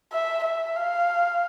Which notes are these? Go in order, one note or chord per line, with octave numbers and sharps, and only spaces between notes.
E5
E5
F5